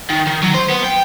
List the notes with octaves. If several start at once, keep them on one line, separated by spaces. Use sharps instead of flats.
D#3
D#3
F#3
C5
B3
G5